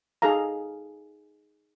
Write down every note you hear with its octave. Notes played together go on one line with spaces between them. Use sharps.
D#4 G#4 A4 F5 A#5